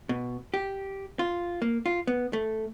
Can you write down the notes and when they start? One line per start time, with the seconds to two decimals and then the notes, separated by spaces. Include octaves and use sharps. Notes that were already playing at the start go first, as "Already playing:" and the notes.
0.09 B2
0.54 G4
1.19 F4
1.62 A#3
1.86 F4
2.07 B3
2.33 A3